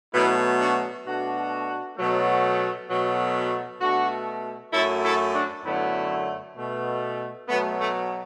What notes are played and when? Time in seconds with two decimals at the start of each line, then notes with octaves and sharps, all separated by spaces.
0.14 B2 F#3 A3 B3 E4
0.59 D4 F#4
1.06 B2 A3 D4 F#4
1.97 B2 F#3 A3
2.90 B2 F#3 A3
3.81 B2 A3 D4 F#4
4.73 F#2 F#3 A3 E4 A4
5.04 E4 A4
5.34 D4 F#4
5.65 F#2 D3 F#3 A3 B3 E4
6.57 B2 A3
7.49 B2 F#3 A3 B3
7.79 A3